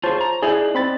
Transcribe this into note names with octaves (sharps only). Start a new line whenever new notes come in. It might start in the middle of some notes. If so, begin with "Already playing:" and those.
F4 G#4 C5 C#5 A5
A#5
D#4 E4 G#4 D5
C4 B5 A6